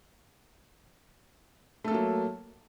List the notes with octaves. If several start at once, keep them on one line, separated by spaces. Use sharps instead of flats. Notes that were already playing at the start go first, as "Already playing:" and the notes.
F#3 A3 A#3 A4